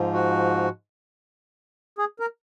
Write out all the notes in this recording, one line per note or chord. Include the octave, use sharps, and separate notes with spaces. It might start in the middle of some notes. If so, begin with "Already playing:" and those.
Already playing: G#2 F3
F#4
G#4
A#4